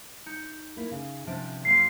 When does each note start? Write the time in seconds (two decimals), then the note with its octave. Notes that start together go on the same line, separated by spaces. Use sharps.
0.26 D#4 G6 C#7
0.77 A#3 E4
0.91 C#3
1.27 C3 F3 C#4 D4 D7
1.65 F#2 A#3 C6 C7